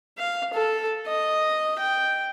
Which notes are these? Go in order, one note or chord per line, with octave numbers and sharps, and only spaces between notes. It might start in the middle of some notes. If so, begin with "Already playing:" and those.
F5
A4
D#5
G5